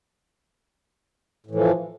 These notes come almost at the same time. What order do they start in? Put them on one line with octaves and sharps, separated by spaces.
A2 E3 F3